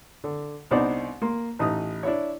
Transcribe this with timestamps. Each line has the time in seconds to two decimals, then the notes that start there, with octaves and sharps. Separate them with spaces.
0.24 D3
0.71 C2 B3 D4 D#4 C5 D5
1.22 A#3 C6
1.59 A1 D#4 D#6
2.03 D4 E4 C#5